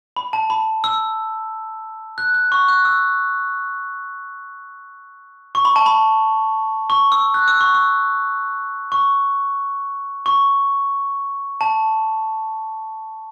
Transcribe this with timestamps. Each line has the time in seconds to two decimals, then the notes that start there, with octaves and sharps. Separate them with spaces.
0.17 B5
0.33 A5
0.50 B5
0.84 E6
2.18 F#6
2.34 F#6
2.52 C#6
2.68 F#6
2.85 E6
5.55 C#6
5.65 B5
5.76 A5
5.86 B5
6.90 C#6
7.12 E6
7.34 F#6
7.48 E6
7.61 C#6
7.74 E6
8.92 C#6
10.26 C#6
11.61 A5